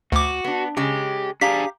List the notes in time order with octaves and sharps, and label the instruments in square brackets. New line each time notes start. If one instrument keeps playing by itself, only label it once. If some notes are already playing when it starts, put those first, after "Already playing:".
[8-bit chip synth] D2 D6 [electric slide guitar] F#4
[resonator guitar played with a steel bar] B3 D4
[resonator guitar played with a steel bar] C#3 G#3 [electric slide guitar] G4
[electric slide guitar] D4 G#4 [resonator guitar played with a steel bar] G4 F5 A#5 [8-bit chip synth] B6